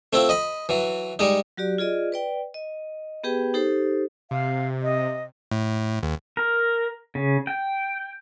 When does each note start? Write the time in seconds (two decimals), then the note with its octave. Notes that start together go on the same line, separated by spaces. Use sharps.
0.13 A3 C4 E4 F4
0.29 D#5 B5
0.69 E3 F#3
1.19 G3 G#3 D#4
1.57 F#3 F#4 G4 D5
1.78 F4 G#4 D5 D#5
2.12 B4 D5 G5
2.54 D#5
3.24 B3 G4 G#4 B4 G5
3.54 D#4 G4 A4 C5
4.31 C3 F5
4.83 D#5
5.52 A2
6.03 D#2
6.37 A#4
7.15 C#3
7.47 G5